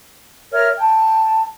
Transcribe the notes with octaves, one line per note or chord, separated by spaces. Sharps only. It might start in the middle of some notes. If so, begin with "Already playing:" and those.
A#4 C#5 E5 F6
G5 A5